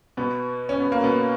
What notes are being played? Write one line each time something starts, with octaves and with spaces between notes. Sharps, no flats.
B2 B3
C#4
B3
A#3
B2 B3